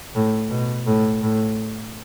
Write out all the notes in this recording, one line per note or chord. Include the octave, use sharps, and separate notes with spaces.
A2
B2
A2
A2